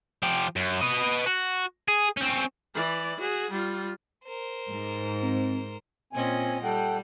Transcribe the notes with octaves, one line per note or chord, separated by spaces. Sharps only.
F3 G4
F#2
B4 D#5
F#4
G#4
C4 C#4
E3 D5
F#4 G#4
G3 F4
A#4 C5
G#2
C4
A#2 C4 C#4 D#5 G#5
G3 A4 F#5 G5